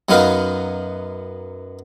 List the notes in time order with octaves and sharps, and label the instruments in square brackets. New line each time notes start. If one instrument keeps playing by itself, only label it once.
[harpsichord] F#2 F#3 B3 D#4 B4 F5